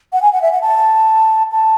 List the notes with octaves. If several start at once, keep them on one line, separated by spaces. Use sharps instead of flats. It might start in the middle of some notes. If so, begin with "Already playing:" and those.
F#5
G#5
F#5
E5
F#5
A5
A5